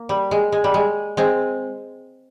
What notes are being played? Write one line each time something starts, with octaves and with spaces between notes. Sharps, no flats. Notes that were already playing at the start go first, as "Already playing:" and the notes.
Already playing: A#3
G3
G#3
G#3
G3
G#3
G#3 C4